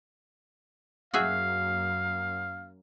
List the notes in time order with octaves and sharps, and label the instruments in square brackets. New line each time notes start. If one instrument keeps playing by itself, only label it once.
[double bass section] F#2 A#3 [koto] F#4 G#4 E5 [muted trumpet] F5